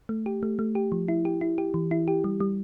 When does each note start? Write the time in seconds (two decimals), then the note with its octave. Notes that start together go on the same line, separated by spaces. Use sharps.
0.09 A3
0.26 G4
0.43 A3
0.59 A3
0.75 G4
0.92 F3
1.08 E4
1.25 G4
1.41 E4
1.58 G4
1.74 E3
1.91 E4
2.08 G4
2.24 G3
2.40 G3